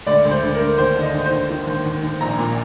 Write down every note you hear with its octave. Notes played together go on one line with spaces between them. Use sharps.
D2 D5
D2
C5
D2
A#4
D2
D#2 C5
D3
D#5
D#2
C5
D#2
D#3
D#2
D#2
D#2
A#1 A#5
A#2